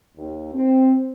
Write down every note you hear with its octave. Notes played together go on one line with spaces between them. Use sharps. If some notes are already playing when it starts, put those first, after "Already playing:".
D#2
C4